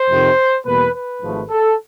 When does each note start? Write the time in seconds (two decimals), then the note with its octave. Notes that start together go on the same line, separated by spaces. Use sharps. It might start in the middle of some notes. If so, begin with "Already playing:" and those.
Already playing: C5
0.09 F2 C3 D#3
0.65 E2 B2 G3 A#3 B4
0.94 B4
1.22 G#1 G#2 F3 A3
1.49 A4